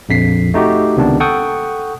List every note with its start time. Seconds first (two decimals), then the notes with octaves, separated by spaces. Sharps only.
0.09 A#1 F2 B6 C7
0.54 A3 D#4 F#4 G4
0.96 C#2 C3 D#3 B3 D4
1.20 A4 F#5 G5 C#6 D#6